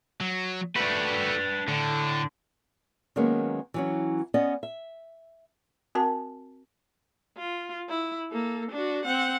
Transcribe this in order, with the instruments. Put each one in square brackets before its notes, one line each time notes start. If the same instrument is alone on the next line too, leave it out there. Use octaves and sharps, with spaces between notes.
[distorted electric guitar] F#3
[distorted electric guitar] A3 F#4 [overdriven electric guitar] D4 B4
[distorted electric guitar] A2 [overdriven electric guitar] D3
[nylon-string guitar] D#3 F#3 G#3 A#3 B3 C#4
E3 F#3 C#4
B3 C#4 D5 D#5
E5
[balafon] C4 F#4 A#4 F#5 A5
[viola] F4
E4
A#3 A4
D4 F#4
C4 F#5